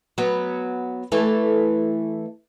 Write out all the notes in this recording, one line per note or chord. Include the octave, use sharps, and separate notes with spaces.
F#3 B3
E3 A3